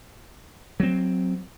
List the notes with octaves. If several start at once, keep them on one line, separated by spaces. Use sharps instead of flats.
F#3 C4